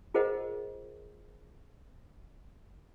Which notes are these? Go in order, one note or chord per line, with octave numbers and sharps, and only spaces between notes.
F4 G#4 A#4 C5 D#5 F#5